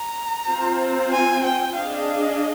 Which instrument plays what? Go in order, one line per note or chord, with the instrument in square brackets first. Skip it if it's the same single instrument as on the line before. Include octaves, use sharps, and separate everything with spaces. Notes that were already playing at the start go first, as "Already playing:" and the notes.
Already playing: [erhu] A#5
[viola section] C4 F4 C5
[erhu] G#5
G5
[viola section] D4 G#4 D#5 [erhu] F5
[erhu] F5